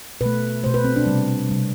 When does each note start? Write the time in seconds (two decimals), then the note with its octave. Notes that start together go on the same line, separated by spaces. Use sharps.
0.21 B2 A3 B4
0.63 A3 C5
0.66 B2
0.74 B4
0.84 C4
0.96 D4
1.06 C3 G3
1.49 C3 G3